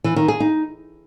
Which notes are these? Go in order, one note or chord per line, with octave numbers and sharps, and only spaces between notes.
E3
D#3
G#4
D#4